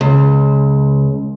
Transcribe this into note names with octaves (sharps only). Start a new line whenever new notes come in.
C#2